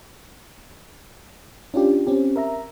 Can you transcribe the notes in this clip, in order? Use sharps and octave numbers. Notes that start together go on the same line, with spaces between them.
C#4 D4 F4 G4
C4 C#4 G4
A#4 E5 A#5